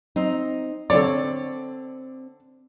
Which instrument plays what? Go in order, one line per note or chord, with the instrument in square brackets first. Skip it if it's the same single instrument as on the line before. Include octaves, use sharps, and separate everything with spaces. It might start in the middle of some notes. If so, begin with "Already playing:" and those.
[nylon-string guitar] C4 D#4
[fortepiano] D3 D5 [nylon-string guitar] C4 C#5